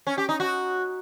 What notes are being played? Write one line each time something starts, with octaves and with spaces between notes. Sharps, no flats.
C#4
G4
D#4
F#4